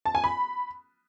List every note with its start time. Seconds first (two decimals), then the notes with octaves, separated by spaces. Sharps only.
0.06 A5
0.15 G#5
0.24 B5